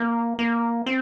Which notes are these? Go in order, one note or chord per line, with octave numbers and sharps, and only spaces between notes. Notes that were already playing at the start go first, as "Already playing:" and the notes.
Already playing: A#3
A#3
C4